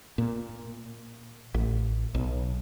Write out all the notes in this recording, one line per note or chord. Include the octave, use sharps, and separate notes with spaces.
A#2
A1
B1